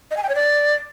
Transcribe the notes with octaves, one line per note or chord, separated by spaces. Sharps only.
D#5
G#5
G5
C#5
D5